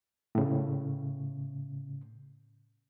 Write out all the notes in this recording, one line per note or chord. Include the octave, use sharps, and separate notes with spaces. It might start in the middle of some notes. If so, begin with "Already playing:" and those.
A2 C#3